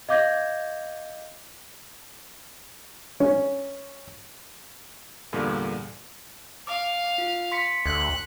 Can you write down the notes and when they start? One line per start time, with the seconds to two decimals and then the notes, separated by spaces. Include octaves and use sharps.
0.09 D#5 F5 D6 G6 G#6 A#6
3.20 C#4
5.33 E2 G2 A#2 D3
6.67 F5 D6
7.18 F4
7.52 C6 B6 C#7
7.86 D2 F#6